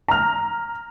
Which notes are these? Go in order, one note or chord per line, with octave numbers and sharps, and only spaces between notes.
A#5 F6